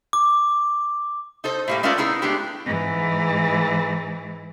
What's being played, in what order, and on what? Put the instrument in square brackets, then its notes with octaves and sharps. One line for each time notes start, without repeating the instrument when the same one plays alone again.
[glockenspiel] D6
[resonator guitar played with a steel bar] D#4 A4 C5
A2 G3 A#3
G#3 A3 C#4 F4 A#4 D5
B3 D#4 E4 G#4
G#3 A3 B3 D4 G4
[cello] G#2 E3